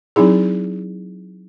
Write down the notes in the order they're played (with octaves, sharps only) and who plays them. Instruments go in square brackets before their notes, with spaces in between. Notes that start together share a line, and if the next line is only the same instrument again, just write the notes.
[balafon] F#3 C4 D#4 E4 G#4